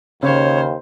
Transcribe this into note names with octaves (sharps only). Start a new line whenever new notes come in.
D#2 C#3 C5 C#5